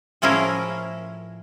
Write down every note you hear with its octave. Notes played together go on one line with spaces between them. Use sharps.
A2 F3 C#4 E4 G#4 A#4